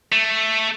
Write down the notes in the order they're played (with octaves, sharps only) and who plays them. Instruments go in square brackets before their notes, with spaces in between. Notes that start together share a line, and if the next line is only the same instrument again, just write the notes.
[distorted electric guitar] A3